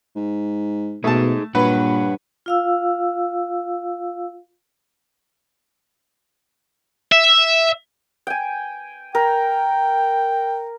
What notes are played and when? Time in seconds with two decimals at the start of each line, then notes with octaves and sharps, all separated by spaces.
0.16 G#2
1.04 B2 A3 D#4 G#4 A5
1.55 G2 A#2 B4 C#5 F#5
2.46 F4 F5 E6
7.12 E5
8.27 G5 G#5
9.15 A#4 G5